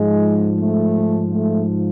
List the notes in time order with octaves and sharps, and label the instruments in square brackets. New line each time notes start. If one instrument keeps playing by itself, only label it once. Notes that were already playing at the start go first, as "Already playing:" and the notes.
Already playing: [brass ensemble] G#2 F3 G#3
A3
A3